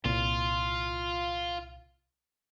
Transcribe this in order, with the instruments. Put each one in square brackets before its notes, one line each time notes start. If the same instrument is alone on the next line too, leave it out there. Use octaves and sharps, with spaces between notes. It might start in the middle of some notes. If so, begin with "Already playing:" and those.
[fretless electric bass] C2 A#2 [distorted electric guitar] F4